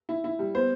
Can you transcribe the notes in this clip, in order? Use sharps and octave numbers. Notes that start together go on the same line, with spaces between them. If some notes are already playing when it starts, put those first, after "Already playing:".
E4
E4
G3
B3 C5